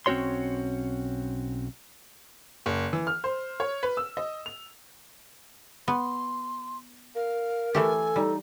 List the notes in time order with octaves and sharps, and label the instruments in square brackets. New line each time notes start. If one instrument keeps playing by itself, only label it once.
[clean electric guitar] B1 C4 C#4 F#4 C#5 C6
[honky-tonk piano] F#1
E3
F6
C5
C#5
B4
E6
D#5
F7
[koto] B3 [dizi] C6
[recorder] A#4 [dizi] F5
[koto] E3 A3 G4 [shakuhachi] A4 [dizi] G#5
[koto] G3 [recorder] D#4